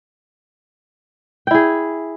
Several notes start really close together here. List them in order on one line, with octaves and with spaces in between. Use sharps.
G5 E4 G#4